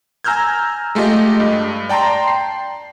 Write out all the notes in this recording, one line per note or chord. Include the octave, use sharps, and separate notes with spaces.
G#5 A#5 E6 F6 G6 G#6
G#3 A3 F4 G4 D#5
G2
D5 G5 A5 A#5 C6
C7